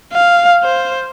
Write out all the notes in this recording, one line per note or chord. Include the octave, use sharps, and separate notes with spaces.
F5
C5